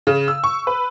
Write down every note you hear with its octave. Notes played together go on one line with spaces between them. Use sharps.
C#3
E6
C#6
B4